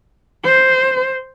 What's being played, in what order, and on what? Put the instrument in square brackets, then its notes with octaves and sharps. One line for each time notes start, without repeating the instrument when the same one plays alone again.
[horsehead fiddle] C5